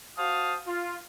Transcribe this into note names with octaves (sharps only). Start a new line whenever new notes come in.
F#4 C5 F5 A5 D#6
F4